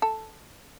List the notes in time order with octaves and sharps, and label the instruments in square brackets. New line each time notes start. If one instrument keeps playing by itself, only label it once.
[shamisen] A4